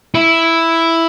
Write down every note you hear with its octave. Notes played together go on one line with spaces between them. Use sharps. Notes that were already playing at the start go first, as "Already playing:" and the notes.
E4